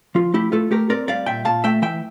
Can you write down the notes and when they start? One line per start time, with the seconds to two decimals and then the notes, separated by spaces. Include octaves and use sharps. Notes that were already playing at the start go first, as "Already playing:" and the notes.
0.15 F3 F4
0.34 A3 E4 G4
0.52 A3 F4 A4
0.71 A3 G4 A#4
0.90 C4 A#4 D5
1.08 G3 D5 F5
1.26 A#2 E5 G5
1.45 A#2 F5 A5
1.64 A3 E5 G5
1.82 E3 E5 G5